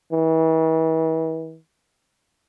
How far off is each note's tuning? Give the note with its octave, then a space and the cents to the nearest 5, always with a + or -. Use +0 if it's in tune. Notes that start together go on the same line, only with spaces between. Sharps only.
E3 -40